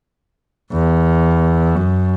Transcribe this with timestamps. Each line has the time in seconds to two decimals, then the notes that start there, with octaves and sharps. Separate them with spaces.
0.72 E2
1.75 F#2